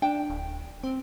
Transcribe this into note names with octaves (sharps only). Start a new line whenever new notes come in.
D4 G5
D1
C4